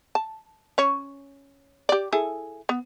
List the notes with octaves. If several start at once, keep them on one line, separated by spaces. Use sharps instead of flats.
A5
C#4 C#5
G4 D5
E4 G#4 A4
B3